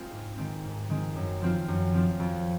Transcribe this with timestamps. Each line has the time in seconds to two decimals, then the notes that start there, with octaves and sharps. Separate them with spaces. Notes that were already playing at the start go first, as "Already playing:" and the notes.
Already playing: G#3 C4 F4
0.11 G#2
0.38 D#3 G#3 C4
0.63 G#2
0.90 D#3 G#3 C4
1.16 F#2
1.41 F3 C4 F4
1.68 F#2
1.94 F3 C4 F4
2.19 F2